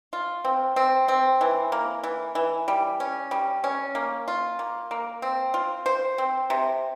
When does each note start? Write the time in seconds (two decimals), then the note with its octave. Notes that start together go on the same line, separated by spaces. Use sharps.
0.13 F4
0.45 C4
0.76 C4
1.08 C4
1.41 E3
1.72 A#3
2.03 E3
2.35 E3
2.68 G3
3.00 C#4
3.31 G3
3.64 C#4
3.95 A#3
4.28 F4
4.59 A#3
4.91 A#3
5.22 C4
5.54 F4
5.86 C5
6.18 C4
6.50 C3